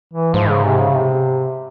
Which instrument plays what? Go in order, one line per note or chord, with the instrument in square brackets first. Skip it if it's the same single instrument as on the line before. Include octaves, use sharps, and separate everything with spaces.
[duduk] E3
[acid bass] G#2 [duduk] F3
[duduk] C#3
C3
C#3
C3